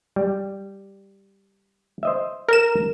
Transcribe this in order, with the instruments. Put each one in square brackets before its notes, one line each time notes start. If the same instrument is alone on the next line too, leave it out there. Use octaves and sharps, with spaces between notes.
[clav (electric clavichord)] G3
C5 D#5 E5
[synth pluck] A#4 E7